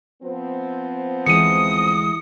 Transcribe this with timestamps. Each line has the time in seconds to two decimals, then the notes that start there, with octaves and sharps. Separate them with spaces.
0.23 F3 B3 C4
1.26 D2 E3 G#3 D#6 C#7 D#7